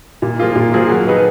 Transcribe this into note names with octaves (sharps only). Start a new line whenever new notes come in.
A#2
F3 A#3 F4 G#4
A#2
F3 A#3 F4 G#4
F#3
B3 D#4 G#4 B4